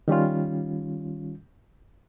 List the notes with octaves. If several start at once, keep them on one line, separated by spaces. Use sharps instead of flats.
D#3 G3 C#4 F4